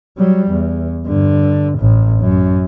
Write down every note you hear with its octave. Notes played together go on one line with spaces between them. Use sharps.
F#3 G3
E2
G2 D3
A1 A2
F#2